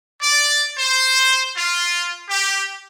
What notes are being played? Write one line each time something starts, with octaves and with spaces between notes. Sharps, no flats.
D5
C5
F4
G4